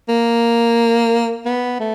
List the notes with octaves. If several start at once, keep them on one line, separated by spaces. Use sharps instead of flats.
A#3
B3
A3